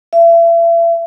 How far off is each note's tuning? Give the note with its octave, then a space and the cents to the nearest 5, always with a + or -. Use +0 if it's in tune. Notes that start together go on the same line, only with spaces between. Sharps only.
E5 +35